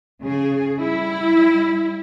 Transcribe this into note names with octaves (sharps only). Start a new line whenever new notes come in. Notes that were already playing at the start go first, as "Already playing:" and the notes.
C#3 G#4
G3 E4